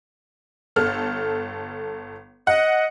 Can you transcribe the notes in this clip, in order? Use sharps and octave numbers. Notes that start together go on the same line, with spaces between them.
G1 A4 F6
D#5 F#5